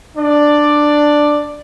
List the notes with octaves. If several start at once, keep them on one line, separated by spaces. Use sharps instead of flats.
D4 D5